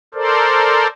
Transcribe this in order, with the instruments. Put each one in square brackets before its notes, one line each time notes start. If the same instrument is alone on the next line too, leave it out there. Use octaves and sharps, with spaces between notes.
[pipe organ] A4 A#4 C5 D5